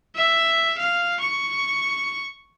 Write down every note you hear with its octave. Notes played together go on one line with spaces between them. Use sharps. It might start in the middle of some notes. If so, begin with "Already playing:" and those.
E5
F5
C#6